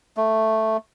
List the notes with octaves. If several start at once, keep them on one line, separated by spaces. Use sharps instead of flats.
A3